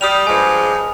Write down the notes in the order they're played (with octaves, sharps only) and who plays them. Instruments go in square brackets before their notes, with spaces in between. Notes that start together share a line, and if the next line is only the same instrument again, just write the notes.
[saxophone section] G3 [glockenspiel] D#6 F6 F7
[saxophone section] G2 F3 G#3 [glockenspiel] G#5